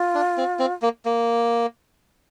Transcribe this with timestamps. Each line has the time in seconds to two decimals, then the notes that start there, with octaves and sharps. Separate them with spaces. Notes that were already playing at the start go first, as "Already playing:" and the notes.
Already playing: F4
0.14 D4
0.38 C4
0.59 C4
0.82 A#3
1.05 A#3